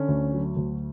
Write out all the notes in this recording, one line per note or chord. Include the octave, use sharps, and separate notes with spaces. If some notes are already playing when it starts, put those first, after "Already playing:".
Already playing: D3 C#4
D2
F#3
D2